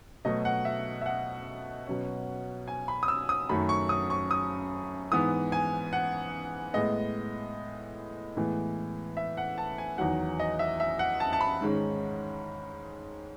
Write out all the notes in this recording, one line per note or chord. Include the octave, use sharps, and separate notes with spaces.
B2 F#3 A3 D#5
F#5
E5
E5
F#5
B2 F#3 C#4
G#5
B5
D#6
E6
D#6
F#2 D#3 F#3 A3 C#4 B5
C#6
D#6
C#6
D#6
G#2 E3 B3 D#6
G#5
F#5
A2 G#3 B3 D#5
A2 E3 G#3 B3
E5
F#5
A5
G#5
E2 D#3 F#3 F#5
D#5
E5
E5
F#5
A5
A5
B5
G#2 D#3 G#3 C#4